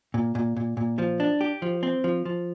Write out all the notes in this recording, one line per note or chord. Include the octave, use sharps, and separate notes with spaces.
A#2
A#2
A#2
A#2
F3
D4
G4
F3
C4
F3
F3